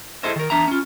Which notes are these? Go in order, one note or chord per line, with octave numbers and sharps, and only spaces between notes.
E4 G#4 A4 C5 D#5 E5
D#3 A#4
E2 D4 E5 A#5
C#4 F4